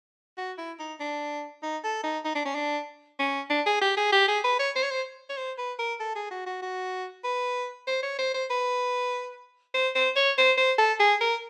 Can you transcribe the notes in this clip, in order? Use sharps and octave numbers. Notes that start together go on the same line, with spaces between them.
F#4
E4
D#4
D4
D#4
A4
D#4
D#4
D4
C#4
D4
C#4
D4
G#4
G4
G#4
G4
G#4
B4
C#5
C5
C#5
C5
C#5
C5
B4
A#4
A4
G#4
F#4
F#4
F#4
B4
C5
C#5
C5
C5
B4
C5
C5
C#5
C5
C5
A4
G#4
A#4